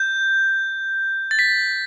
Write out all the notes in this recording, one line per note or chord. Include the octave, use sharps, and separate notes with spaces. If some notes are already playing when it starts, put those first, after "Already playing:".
Already playing: G6
A6
B6